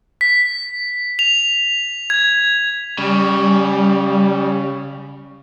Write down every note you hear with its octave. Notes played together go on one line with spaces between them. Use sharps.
B6
F7
G#6
C#3 G3